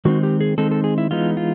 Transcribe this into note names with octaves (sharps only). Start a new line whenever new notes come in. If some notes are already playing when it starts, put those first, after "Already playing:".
D#3 G#3 C4 D#4 F#4
G4
G#4
D#3 G#3 C4 D#4 A4
A4
G#4
E4
E3 G#3 B3 D#4 F4
F4